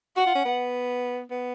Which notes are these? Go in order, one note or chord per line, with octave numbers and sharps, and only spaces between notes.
F#4 F#5
F4
C#4
B3
B3